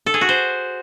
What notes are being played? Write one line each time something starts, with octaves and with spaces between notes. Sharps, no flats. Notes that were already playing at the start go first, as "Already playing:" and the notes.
A4
G#4
F#4
C5